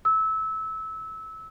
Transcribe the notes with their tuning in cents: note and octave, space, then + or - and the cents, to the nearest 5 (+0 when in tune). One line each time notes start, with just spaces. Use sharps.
E6 -20